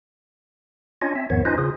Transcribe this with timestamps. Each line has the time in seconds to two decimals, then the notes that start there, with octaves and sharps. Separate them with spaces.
1.02 C#4 D4 F4 C#5 D#5
1.15 C4 E5
1.30 E2 G#2 D#3 F3 B3 C#5
1.45 C#4 D#4 F4 B4 C5 D#5
1.58 C#3 F4 G#4